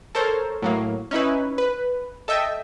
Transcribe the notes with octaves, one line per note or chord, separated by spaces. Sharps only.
A4 A#4 C5 C#5
A2 F#3 A#3
C#4 D#4 E4 B4
B4
A4 D#5 E5 G5